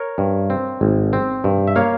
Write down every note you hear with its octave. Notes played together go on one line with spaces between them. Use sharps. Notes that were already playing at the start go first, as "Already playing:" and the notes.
Already playing: A#4 C#5
G2
C4
G#1
C4
G2
E5
A#3 C#5 F5